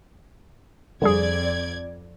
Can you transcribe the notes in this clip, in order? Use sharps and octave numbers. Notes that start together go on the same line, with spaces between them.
F2 D3 G3 G#4 D5 G#6